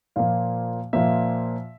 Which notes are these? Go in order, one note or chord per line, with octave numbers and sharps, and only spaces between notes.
A#2 F3 A#3 F5
A#2 F3 A#3 E5